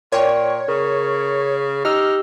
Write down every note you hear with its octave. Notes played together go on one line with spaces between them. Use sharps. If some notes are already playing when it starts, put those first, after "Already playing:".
A#2 C#5 D5 G5 C#6
C#3 A#4
D#4 G4 E6 F6